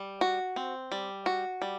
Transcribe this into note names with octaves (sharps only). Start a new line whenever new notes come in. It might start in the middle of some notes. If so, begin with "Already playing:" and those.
Already playing: G3
F#4
C4
G3
F#4
G3